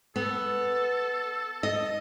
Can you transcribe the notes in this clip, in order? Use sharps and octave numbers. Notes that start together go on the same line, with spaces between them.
B3 A4
D#5